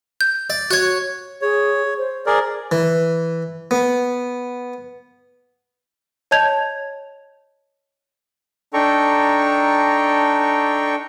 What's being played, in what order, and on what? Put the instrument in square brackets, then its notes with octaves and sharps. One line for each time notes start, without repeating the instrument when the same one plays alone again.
[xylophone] G6
[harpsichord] D5
[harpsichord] F#4 C#5 [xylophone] F#6 G#6
[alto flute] G#4 [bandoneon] C#5
[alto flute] C5
[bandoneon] G#4 A#4 D5
[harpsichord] E3
B3
[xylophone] C#5 D#5 A5 G6 G#6 F7
[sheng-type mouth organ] D4 D#4 A4 G5 A#5 C#6